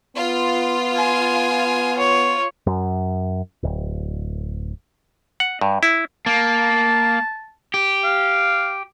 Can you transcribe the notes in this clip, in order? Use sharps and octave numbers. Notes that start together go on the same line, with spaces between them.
B3 F4
G#5
C#5
F#2
D1
F#5
G2
E4
A#3 A5
G4
F5